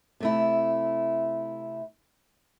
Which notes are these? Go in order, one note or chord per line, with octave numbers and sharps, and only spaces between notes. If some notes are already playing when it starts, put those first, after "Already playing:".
C3 A3 E4